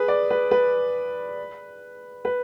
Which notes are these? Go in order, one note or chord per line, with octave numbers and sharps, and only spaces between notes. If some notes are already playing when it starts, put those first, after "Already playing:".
Already playing: G#4 B4
D5
B4
B4
B4